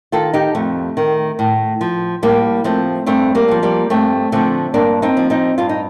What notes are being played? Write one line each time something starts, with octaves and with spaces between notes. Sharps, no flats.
D#3 F4 A4
D#4 G4
F2 A3
D#3
A2
F3
A2 G3 A#3
F3 A3 C4
G2 A3 C4
G3 A#3
D3
F3
G3 A#3
G2 A3 C4
D3 F3 A3 C4
G2 A#3 D4
C4 D#4
F3
C4 D#4
G2 F4
D#4